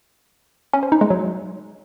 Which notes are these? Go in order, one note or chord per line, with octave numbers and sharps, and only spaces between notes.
C#4
C5
D#4
G#3
F#3